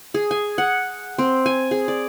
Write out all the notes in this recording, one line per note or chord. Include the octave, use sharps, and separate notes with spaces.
G#4
G#5
F#5
C4
G#5
G#4
D5